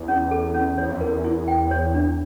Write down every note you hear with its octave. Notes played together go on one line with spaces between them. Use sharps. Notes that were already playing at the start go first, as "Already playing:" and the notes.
Already playing: E2 E4
C#4
A4
C#4
E2 C#5
F2
E2 A#4
E4
G5
C#5
D4